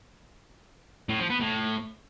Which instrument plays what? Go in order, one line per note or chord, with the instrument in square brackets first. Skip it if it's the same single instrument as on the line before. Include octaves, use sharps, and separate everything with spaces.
[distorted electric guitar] A2
F3
B3
A2